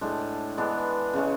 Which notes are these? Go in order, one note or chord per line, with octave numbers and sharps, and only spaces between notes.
A2 G#3 D4
E3 G#3 B3 D4
C#3 G#3 C#4